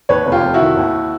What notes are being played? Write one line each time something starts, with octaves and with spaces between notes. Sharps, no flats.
D#2 B4 C#5
F1
F4 G4
F1
E4 F#4
D#3
D#2